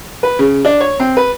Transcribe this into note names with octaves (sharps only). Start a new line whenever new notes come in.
B4
C#3
D4
C#5
C4
B4